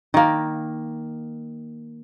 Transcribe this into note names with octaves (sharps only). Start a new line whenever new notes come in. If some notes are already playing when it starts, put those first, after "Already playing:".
D#3 A#3